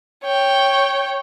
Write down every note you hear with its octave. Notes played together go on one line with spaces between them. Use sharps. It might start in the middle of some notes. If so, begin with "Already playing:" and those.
C#5 G5